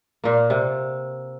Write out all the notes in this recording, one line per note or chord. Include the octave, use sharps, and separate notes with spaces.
A#2 A#3
C3